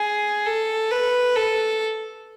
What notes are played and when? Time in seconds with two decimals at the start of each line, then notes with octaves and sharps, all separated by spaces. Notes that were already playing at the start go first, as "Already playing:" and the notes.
Already playing: G#4
0.46 A4
0.91 B4
1.36 A4